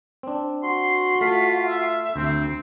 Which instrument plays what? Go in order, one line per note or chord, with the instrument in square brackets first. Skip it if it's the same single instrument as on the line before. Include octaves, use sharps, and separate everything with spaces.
[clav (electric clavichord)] C4 D4
[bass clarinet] F#4 [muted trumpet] C6
[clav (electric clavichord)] A3 [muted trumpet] F4 [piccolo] B6
[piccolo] E5
[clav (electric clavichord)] D2 [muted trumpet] C4